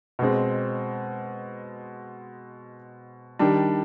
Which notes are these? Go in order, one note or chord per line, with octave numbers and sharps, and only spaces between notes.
B2 G#3 C4
D#3 G3 D4